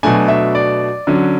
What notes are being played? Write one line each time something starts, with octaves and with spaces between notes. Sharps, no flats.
B2 F#3 A3 D4 G#5
E5
D5
D3 F#3 C#4